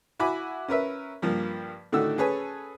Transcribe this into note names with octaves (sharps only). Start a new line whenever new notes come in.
E4 F#4 G#5 B5 D6
C#4 A#4 B4 E5
G2 F3 A#3
A2 D3 D#3 A3 F#4 E6
C#4 G#4 A4 B4 C#5 G#5